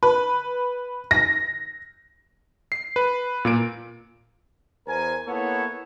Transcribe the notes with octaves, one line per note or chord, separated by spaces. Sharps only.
B4
A#6
C7
B4
A#2 A#3 D7
E2 A#4 C5 G#5
A#3 B3 E4 A4 C#5